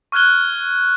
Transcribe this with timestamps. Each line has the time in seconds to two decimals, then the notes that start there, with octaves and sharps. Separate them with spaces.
0.12 C#6 F6 F#6 G#6 G7